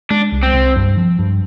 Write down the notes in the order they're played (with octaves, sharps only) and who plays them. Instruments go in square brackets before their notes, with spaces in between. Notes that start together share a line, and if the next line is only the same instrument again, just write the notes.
[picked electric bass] G#3 [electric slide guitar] D4
[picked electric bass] C2
[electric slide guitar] C4
[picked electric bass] C2
G2
F3
G2